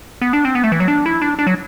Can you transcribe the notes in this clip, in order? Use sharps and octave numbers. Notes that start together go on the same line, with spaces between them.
B3
D4
C4
B3
A3
E3
F#3
D4
E4
D4
D4
F#3